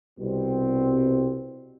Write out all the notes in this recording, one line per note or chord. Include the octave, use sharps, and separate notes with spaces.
C2 B2 G3 C4